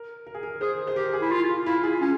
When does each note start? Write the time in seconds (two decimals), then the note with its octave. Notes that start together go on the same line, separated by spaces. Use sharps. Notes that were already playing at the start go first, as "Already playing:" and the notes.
Already playing: A#4
0.27 A#4
0.34 G#4
0.43 A#4
0.61 G#4 C5
0.87 C5
0.96 G4 A#4
1.13 G#4
1.21 E4
1.32 F4
1.49 F4
1.66 E4 F4
1.83 G#4
2.01 C#4